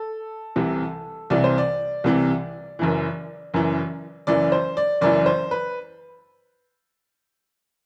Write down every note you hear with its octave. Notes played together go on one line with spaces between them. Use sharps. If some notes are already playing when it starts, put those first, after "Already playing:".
Already playing: A4
C2 C3 E3
C2 C3 E3 D5
C5
D5
C2 C3 E3
F#1 F#2 E3
F#1 F#2 E3
F#1 F#2 E3 D5
C5
D5
F#1 F#2 E3 D5
C5
B4